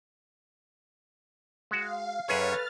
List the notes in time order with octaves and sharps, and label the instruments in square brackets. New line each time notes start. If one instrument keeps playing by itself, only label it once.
[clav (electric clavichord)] G#3 F#4 [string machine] F5
[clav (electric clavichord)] F#2 C#4 G#4 [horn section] A4 B4 [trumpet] C#5 [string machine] F6 A6